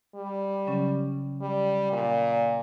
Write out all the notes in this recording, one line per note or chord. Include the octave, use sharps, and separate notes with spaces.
G3
C#3 F#3 C#4
G3
A#2